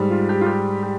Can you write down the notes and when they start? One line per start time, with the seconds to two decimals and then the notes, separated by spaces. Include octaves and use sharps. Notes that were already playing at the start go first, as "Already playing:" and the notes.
Already playing: G#2 G3
0.11 F4
0.29 G4
0.41 F4
0.46 G4
0.83 G4